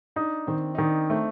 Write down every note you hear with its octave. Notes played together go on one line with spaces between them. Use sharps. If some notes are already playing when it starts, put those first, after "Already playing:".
D4 D#4
D#3 C4
D#4
D#3 D4
A3 C4